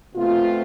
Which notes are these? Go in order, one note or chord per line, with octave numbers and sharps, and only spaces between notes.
B2 A3 C4 F4